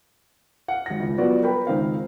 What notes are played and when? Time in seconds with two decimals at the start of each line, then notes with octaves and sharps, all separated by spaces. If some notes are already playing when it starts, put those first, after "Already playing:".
0.68 F5 F#5
0.86 G#1 A#6
1.00 C#2
1.18 F#3 G3 B3 F4 F#4 D5
1.43 A#4 B4 G5 B5
1.67 C#2 D#3 C4 F5